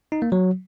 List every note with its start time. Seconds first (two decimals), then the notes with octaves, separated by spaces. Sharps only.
0.12 D#4
0.22 A#3
0.32 F#3